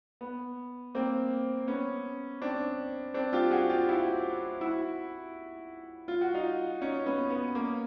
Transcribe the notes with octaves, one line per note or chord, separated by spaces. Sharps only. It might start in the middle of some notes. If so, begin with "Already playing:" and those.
B3
A#3 C4
B3 C#4
C4 D4
C4 D4
F4 G4
F#4 G#4
F4 G4
E4 F#4
E4 F#4
F4
F#4
D#4 F4
C#4 D#4
B3 C#4
B3
A#3